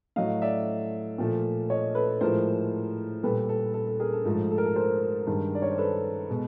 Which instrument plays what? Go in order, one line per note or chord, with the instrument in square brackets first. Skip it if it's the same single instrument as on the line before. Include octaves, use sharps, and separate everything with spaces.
[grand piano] A2 F#3 A3 D#5 F5
D5 E5
A#2 F3 A3
C#5 D#5
A4 B4
A2 F3 G#3 A#4 C5
A#2 G3 A4 B4
A4
A4
A4
G#4 A#4
A4
G#2 F3 A3
A4
A#4
A4
A#4 C5
G2 D#3 G#3
D5
C#5
C5
A4 B4
B2 G#3